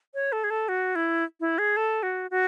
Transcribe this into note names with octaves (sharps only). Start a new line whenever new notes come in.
C#5
A4
G#4
A4
F#4
E4
E4
G#4
A4
F#4
F#4